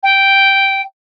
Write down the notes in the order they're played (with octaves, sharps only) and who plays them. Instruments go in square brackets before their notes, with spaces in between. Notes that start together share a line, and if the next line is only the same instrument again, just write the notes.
[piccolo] G5